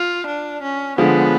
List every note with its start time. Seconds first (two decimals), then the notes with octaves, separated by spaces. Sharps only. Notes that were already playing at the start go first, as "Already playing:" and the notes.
Already playing: F4
0.27 D4
0.63 C#4
0.98 D3 F3 G#3 B3